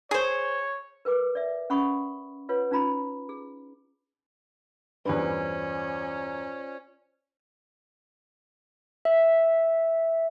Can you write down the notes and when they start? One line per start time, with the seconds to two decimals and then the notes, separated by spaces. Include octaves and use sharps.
0.11 G#4 C5 C#5
1.05 A#4 B4 G5 D6
1.35 D5 E5
1.70 C#4 F#5 B5 C#6 D#6
2.49 F4 B4 C#5 F#5
2.71 C#4 D#4 F4 A#5 B5
3.29 G#4
5.06 E2 G2 C#4 F4 B4 C5 D5
9.05 E5